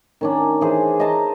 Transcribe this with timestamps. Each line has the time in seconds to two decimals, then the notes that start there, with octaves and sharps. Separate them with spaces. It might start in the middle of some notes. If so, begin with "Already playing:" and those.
0.21 D#3 C#4 D4
0.61 E3 G#4 C5
1.00 D#5 A5 A#5 C6